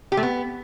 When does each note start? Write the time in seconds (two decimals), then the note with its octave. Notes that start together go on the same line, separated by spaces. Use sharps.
0.12 G4
0.17 A3
0.23 B3